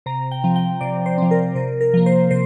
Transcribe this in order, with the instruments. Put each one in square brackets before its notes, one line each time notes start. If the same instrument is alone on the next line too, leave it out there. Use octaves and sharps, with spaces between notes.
[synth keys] C3 A#5
G5
F3 C4
G5
C3 D5
C5
F3 C4
A#4
C3 A#4
A#4
F3 A#3
C5
C3 C5